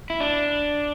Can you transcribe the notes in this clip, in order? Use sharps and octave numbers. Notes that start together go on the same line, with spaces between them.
E4
D4